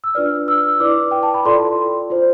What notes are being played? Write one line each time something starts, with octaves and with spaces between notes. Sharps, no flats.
E6
D4 F4 B4 D5 F6
E6
E4 B4 D5 D6
G5
A5
B5
F4 A4 D5 C6
F4 C5